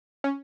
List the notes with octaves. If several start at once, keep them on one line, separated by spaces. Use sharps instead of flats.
C#4